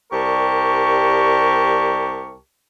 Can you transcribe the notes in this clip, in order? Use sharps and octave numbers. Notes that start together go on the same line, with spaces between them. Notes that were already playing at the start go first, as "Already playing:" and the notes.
C2 G3 G4 A#4 A5 C#6